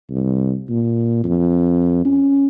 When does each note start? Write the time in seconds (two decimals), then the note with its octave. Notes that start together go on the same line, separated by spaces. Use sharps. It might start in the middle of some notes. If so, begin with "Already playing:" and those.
0.10 C2
0.69 A#2
1.24 F2
2.05 C#4